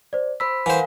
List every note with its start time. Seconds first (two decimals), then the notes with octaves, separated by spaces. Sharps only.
0.13 C5 D5
0.40 C5 B5 E6 B6
0.66 E3 A#4 C5 F5 F#5 G#5